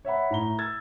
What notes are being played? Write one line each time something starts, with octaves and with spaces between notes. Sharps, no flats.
C#5 E5 F#5 B5
A2 A#5 G7
E6 G#6 A6